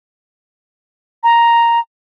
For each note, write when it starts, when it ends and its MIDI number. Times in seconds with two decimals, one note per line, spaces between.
1.24 1.80 82